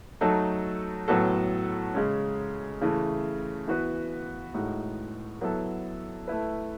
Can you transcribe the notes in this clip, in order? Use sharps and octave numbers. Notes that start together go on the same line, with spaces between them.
F#3 A3 D#4 A4
A2 F#3 B3 F#4 A4
C#3 G#3 C#4
C#3 E3 A3
E3 B3 F#4 B4
A2 G#3 D#4 F#4
F#3 B3 E4 A4
A3 E4 B4